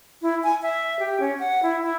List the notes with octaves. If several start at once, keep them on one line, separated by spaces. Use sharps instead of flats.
E4
G#5
E5
G4
C#4
F#5
E4
E4